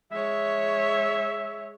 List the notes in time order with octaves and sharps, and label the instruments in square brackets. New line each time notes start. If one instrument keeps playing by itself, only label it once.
[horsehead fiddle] G#3 C#5 [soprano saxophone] E5